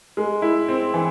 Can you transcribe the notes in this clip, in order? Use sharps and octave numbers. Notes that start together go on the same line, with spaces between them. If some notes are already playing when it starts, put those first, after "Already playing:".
G#3
E4
C4
E3